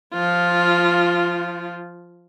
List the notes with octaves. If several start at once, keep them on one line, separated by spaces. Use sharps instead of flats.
F3 F4